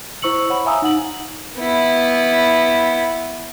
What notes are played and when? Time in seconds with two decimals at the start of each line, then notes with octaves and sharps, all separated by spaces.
0.22 E4 C5 C#6 E6 C#7 F#7
0.49 C#5 F#5 B5
0.65 E5 F5 G#5 A#5 D#6 E6
0.82 D#4 F#5 F#7
1.58 B3 E4